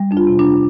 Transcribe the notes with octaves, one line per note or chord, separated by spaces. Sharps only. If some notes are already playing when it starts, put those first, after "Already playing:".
Already playing: G3
F2 D4
F4
C3
D4